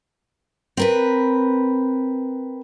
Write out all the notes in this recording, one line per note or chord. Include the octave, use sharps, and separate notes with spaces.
C4 A#4 B4